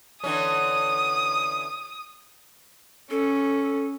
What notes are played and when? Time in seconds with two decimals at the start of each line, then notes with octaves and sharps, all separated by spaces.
0.24 D3 E3 C#4 D#6
3.11 C#4 A4